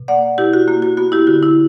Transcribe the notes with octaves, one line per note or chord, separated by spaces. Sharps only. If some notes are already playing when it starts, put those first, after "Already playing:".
Already playing: B2
A#3 D5 F#5
B2 E4 G4
F#4
A#3 F#4
F#4
B3 F#4
E4 G4
D3 F#4
E4